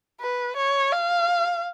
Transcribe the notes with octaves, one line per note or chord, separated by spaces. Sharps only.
B4
C#5
F5